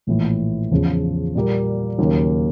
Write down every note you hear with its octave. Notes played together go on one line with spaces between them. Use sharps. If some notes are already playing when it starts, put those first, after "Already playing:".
A#1 A2 E3
E2 C#3 F3
A#2 G3 A#3
D#2 C#3 F#3 A#3 D#4